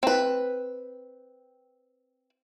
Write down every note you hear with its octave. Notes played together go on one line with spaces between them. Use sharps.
C4 B4